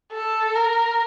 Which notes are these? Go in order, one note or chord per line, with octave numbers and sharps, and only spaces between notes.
A4
A#4